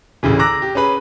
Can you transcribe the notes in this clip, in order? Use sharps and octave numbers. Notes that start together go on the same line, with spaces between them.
A1 D2 C#3 E3
A#5 D6 E6 F#6 A#6
G4
C#4 G#4 B4 B5